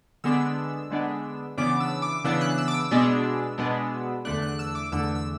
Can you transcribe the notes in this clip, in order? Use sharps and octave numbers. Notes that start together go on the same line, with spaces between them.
D3 G#3 B3 D4 E6
D3 G#3 B3 D4
C#3 E3 B3 D4 D6
E6
D6
C#3 E3 B3 D4 E6
F#6
E6
D6
E6
B2 G#3 B3 D4
B2 G#3 B3 D4
E2 D3 A3 D4 F#6
F#6
E6
D6
E2 D3 A3 D4 E6
E6